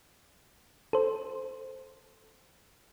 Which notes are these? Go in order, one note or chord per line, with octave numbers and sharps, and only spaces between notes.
A4 C5